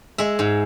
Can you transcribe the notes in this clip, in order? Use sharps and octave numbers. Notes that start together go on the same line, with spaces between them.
G#3 E5
G#2